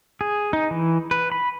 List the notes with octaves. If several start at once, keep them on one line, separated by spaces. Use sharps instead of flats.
G#4
D#4
E3
B4
B5